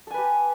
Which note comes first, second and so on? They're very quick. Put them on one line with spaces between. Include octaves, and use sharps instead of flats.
A4 G#5 B4 G4